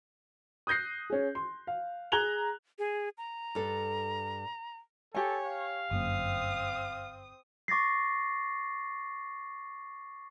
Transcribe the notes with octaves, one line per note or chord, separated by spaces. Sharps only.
D#6 F#6 G6 A#6 C7
C#4 G#4
C6
F5
G#4 A#5 F#6 G#6 F7 G7
G#4
A#5
G2 A4
G4 A4 C#5 G#5
F5
G1 F#2 A#3 C4 D#6
C#6 D6 A6 A#6 C7